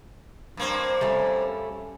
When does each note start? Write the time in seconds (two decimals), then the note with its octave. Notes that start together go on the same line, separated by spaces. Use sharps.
0.57 G2 A#3 C4
1.01 G3 A3 C#4